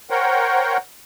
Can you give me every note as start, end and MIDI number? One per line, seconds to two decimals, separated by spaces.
0.10 0.77 70
0.10 0.77 72
0.10 0.77 73
0.10 0.77 78
0.10 0.77 79